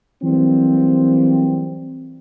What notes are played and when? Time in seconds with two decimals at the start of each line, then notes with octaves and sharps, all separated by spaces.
0.24 E3 F#3 G3 A#3 C4